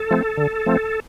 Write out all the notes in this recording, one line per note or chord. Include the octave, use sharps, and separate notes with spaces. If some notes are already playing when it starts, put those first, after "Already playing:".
Already playing: A4
F3 A3 C4
D3
F3 A3 C4